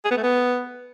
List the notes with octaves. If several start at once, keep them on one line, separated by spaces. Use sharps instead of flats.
G#4
B3
A3
B3